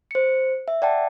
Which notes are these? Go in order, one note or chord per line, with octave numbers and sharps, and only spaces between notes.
C5 C#7
E5
D5 F#5 G5 A5